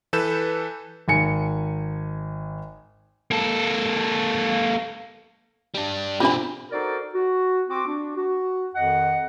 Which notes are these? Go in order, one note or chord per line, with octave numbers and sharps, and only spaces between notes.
E3 A4 B4 G6 E7
G#1 G#5 C#7
A#3 A4
G3 D4
B2 C4 D4 F4 G4 B5
D#4 F#4 A4 A#4 C5 D5
F#4
C4 F#4 D6
D4 F#4
F#4
F2 D#3 D#5 F#5